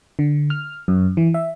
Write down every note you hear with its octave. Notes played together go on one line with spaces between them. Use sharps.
D3
F6
F#2
E3
E5